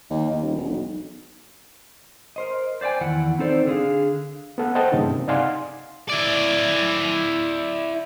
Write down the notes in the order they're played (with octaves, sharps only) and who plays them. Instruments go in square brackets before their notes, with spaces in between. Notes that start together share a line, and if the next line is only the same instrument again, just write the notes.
[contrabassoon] D#2
D#2
D#1
E1
B1
[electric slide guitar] A#4 C5 D#5
C5 D5 F5 G5 G#5
E2 D#3 E4 F#5
C4 D#4 A4 C5 D5
D3 G#4 F5
[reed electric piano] B3 A4 F#5
C5 D#5 F#5 G5 A5
G2 C#3 A#3 D#4
C3
D#4 D5 F5 F#5 G#5 C6
[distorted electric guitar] E4 D5